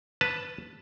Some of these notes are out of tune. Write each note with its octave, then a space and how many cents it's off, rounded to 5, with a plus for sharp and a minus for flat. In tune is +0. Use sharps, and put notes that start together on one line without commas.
B4 +0 A5 +0